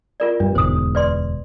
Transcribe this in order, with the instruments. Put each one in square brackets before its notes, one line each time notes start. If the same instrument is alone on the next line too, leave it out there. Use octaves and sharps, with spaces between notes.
[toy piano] F4 A#4 D5
[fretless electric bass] G2 [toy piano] D4
[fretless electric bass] E1 D2 G#2 [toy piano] C5 D#6
[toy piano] B4 D5 C6